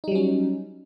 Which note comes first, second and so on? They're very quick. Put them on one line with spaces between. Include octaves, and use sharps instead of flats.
D#4 G3 F#3 C#4